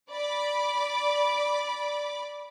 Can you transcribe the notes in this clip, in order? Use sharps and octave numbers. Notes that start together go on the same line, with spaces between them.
D5 B5 D6